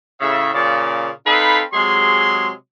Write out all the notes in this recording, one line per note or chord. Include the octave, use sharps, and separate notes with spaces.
A2 C#3 E5
A#2 C#3 D5
C4 D#4 A4 B4 F5 B5
C3 F#3 G#3 G#4 C6